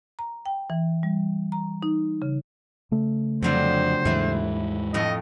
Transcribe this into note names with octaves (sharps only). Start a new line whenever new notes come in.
A#5
G5
E3
G3
A#5
D#4
C#3
C#3 A3
F2 D3 F#3 G3 C5
D#2 G#2 E3 G#3 E4
F2 A2 D#5